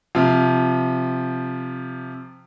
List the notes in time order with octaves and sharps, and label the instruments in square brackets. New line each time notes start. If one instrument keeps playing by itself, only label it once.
[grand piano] C3 F3